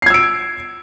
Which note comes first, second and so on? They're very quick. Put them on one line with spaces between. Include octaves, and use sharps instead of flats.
C7 G#6 E6 D7